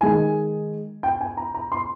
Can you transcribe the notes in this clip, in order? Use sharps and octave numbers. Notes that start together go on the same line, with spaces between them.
D#3 G#3 D#4 G#5
G5
G#5
A#5
A#5
C6